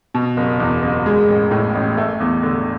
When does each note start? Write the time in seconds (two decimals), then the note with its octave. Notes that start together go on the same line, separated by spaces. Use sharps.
0.14 B2
0.37 F#1
0.60 E2
0.83 F#1
1.06 G#3
1.28 A1
1.51 A2
1.75 A1
1.97 A3
2.20 E2
2.43 D3